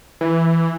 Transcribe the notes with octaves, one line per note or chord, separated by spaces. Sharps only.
E3